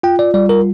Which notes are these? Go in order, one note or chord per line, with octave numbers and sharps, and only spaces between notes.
F4 G5
D5
G3 D5
A#4